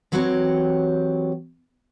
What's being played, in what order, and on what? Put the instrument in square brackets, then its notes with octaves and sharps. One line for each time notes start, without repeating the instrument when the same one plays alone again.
[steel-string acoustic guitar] E3 F#3 C4 F#4 G4 C#5